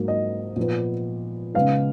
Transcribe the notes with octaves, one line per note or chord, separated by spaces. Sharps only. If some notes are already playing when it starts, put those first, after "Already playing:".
Already playing: G#2 F#3 A#3
D#5
A#2 F3 B3
C#3 G#3 B3 F5